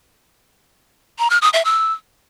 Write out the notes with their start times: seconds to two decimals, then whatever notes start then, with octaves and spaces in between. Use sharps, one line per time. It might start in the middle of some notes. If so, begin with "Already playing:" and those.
1.19 A#5
1.30 F6
1.42 D#6
1.53 E5
1.65 E6